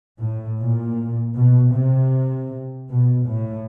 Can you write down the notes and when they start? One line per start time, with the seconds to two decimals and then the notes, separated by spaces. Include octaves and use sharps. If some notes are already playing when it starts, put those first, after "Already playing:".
0.20 A2
0.59 A#2
1.35 B2
1.73 C3
2.89 B2
3.27 A2